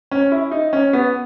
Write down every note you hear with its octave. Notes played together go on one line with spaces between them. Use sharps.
C#4
E4
D#4
C#4
B3